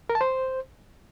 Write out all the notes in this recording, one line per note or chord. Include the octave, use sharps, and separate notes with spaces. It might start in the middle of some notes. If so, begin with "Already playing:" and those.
A#4
A5
C5